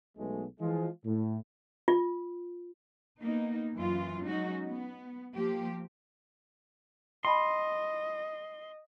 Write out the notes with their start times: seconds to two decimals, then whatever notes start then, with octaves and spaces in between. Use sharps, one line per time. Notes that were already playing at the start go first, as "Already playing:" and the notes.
0.18 B1 B2 G#3 A3
0.60 E3 F3 G#3 F4
1.05 A2
1.88 F4
3.20 A#3 B3 D#4
3.73 F#2 E3 F4
4.23 F#3 G#3 C#4 D#4 F#4
4.66 B3
5.33 F3 A#3 G4
7.25 D#5 G5 A5 B5 C6